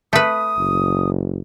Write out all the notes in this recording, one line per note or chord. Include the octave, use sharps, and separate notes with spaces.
A3 B4 D#6
F#1